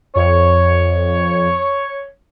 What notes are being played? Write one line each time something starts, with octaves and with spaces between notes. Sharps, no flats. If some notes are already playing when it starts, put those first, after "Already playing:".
F2 C#5